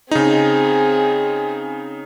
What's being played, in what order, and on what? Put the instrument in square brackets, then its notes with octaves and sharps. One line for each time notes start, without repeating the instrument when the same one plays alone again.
[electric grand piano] C#3 D#4 [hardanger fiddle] C4 G#4